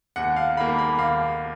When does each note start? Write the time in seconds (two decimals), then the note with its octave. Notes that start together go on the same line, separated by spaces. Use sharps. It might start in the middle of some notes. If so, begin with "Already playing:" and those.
0.16 D#2 F#5
0.36 F5
0.57 D#3 B5
0.60 A#3
0.78 B5
0.98 D#2 F5